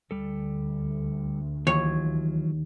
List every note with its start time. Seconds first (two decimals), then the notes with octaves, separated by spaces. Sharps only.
0.11 D2 G3 A4
1.67 D#2 E3 F#3 F4 C#5